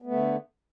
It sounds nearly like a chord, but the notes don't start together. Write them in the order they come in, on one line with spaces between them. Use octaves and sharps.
B3 A3 D3